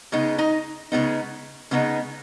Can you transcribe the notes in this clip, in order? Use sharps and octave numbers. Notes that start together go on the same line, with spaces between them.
C#3 G#3 B3 D#4
D#4 D#5
C#3 G#3 B3 D#4
C#3 G#3 B3 D#4